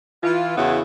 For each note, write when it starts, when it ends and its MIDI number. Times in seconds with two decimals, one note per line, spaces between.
0.23 0.56 52
0.23 0.56 65
0.57 0.81 40
0.57 0.81 49
0.57 0.81 59
0.57 0.81 64
0.57 0.81 66